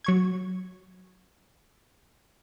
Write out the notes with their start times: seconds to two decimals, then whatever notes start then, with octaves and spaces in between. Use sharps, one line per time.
0.04 F#3 C#6 G#6